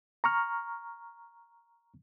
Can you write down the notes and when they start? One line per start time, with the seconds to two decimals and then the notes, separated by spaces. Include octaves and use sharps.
0.24 A#5 C#6 F6